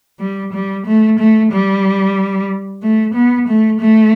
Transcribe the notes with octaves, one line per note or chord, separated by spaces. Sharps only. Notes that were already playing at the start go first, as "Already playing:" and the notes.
G3
G3
A3
A3
G3
A3
B3
A3
A3